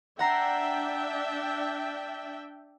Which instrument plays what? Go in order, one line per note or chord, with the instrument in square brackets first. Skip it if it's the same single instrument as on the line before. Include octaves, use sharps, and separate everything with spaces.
[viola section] D4 E5 G5 [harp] F#5 A#5 C7